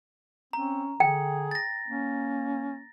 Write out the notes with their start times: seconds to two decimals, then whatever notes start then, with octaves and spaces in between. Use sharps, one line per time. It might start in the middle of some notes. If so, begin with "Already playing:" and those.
0.53 C4 C#4 A#5
1.00 D3 G#4 G5
1.51 A6 A#6
1.88 A#3 C#4